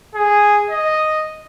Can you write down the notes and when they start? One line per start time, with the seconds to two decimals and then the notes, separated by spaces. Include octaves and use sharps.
0.15 G#4
0.70 D#5